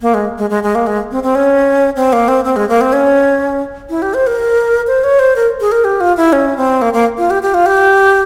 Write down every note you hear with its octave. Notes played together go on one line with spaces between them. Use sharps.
A#3
G#3
G#3
G#3
G#3
A#3
G#3
C4
C4
C#4
C4
A#3
C4
C4
G#3
A#3
C4
C#4
E4
G4
C5
A#4
C5
C#5
C5
A#4
G#4
A#4
G4
F4
E4
C#4
C4
A#3
A#3
F4
G4
G4
F4
G4